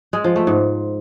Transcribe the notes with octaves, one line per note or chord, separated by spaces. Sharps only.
G#3
F3
A3
G#2